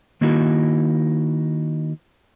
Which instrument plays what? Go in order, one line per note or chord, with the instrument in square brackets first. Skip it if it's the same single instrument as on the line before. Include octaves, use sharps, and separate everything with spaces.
[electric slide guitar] D#3 A#3 D#4 E4 F#4